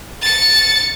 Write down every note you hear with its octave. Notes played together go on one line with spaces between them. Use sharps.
A6 C#7